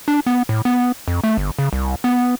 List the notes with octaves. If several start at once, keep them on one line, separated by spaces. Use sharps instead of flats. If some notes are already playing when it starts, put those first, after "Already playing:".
D4
B3
A2
B3
F2
A3
G1
C#3
C2
B3